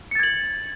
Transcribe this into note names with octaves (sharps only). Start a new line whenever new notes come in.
G#6 A6 C#7 F#7